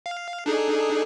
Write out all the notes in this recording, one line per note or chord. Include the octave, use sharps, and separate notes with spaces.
F5
D4 D#4 G#4 A4